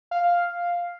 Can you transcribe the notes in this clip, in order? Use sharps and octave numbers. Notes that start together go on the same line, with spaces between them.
F5